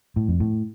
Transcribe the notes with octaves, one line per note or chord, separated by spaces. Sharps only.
A2
F2
A2